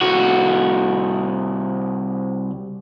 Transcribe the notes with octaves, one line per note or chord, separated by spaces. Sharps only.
C2 F#4